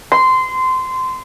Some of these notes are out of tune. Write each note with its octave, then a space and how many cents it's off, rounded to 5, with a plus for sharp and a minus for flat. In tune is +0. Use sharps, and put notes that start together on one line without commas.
C6 -20